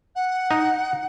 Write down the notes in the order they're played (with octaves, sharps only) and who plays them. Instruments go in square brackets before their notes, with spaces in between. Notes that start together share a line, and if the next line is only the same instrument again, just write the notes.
[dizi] F#5
[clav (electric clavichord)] D#4